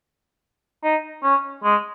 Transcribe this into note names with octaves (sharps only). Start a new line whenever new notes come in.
D#4
C#4
G#3